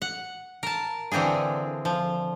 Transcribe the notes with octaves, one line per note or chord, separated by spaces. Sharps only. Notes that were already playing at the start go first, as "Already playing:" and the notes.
F#5
A#4 A5
D3 E3 C4 F4 G#4
F3